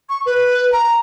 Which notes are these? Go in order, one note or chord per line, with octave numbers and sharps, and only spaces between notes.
C#6
B4
A#5